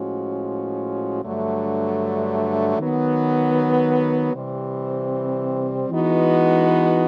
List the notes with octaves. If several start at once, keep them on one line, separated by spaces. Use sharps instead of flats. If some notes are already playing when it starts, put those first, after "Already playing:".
Already playing: A2 F3 G#3 C#4 F#4
G2 D3 F#3 A3
D#3 F#3 B3
C3 E3 G3 C4
E3 G#3 B3 D#4 F#4